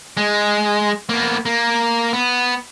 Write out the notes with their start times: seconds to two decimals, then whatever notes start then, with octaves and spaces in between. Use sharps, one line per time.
0.17 G#3
1.09 A#3 B3
1.46 A#3
2.13 B3